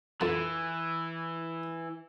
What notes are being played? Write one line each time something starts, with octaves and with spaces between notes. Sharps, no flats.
F2 E3 A5